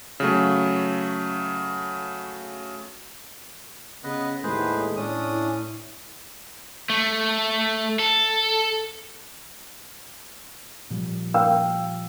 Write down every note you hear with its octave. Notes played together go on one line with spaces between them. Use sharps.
C#3 F#3 A3
C#3 B3 B4 D#5
D#2 A2 G#3 G#4 B4 C5
A2 C#4 D4 D#6
E4
A3
A4
A#2 F3 G3
F5 G5 E6